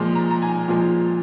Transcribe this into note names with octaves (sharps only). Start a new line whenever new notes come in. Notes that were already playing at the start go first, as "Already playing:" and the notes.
Already playing: A#2 F3 G#3
A#5
A#5
G#5
A#2 F3 G#3